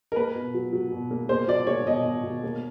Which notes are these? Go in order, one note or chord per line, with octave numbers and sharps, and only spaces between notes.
A#4
A#3 B4
B2
F#3
F#3
B2
A#3
A#3 C5
F#3 D5
A#3 C#5
B2 D#5
B2
B2
A#3